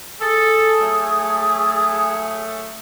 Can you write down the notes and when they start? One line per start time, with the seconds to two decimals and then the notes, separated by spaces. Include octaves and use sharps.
0.21 G#4 A4
0.81 F#3 A3